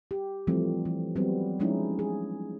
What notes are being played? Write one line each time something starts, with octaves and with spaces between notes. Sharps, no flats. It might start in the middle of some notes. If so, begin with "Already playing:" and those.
G4
E3 F3 G3 A3 C4
E3
F#3 G3 B3 C4
F3 G#3 C#4 D#4 E4
G#4